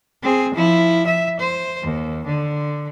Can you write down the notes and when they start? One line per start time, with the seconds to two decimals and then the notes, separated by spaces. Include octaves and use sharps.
0.23 C4 G#4
0.54 F3 E4
1.07 E5
1.40 C5
1.82 D#2
2.26 D3